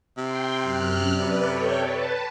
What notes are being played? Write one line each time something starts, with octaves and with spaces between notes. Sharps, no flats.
C3 G5 C6
F#2 F6 F#6
B4 D5
A4 C#5 G5
B4 A5